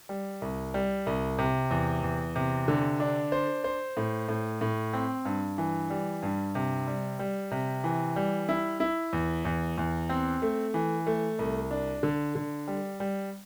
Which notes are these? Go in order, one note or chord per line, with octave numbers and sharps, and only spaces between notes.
G3
C2
G3
C2
C3
E2
E2
C3
D3
D4
C5
C5
A2
A2
A2
C4
G2
E3
G3
G2
C3
G3
G3
C3
E3
G3
E4
E4
E2
E2
E2
C4
A3
E3
A3
C2
D4
D3
D3
G3
G3